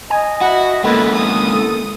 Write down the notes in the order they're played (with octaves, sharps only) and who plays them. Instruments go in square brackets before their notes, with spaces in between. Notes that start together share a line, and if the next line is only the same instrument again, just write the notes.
[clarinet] D#5 [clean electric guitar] G#5
[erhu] E4 [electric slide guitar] F#4 [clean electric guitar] F#5
[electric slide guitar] G#3 C#4 E4 [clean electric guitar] A#3 B3 [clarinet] A4 [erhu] B4
[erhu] D#6
[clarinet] A4